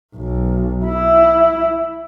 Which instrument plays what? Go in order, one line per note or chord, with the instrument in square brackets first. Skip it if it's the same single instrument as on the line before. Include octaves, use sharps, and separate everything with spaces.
[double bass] B1
E4